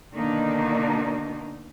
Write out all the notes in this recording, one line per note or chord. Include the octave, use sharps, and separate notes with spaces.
B2 D3 D#3 A#3 D4 D#4